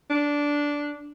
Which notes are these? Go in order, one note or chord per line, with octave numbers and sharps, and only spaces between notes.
D4